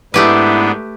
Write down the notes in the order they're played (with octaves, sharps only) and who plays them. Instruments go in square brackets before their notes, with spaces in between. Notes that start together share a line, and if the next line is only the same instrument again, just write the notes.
[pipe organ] G#2 B3 D4 [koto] A3 G4 B4 [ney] E4